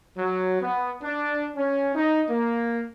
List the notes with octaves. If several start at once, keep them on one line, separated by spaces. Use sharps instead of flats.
F#3
B3
D4
C#4
D#4
A#3